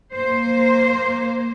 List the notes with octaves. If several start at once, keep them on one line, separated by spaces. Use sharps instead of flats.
A#3 C5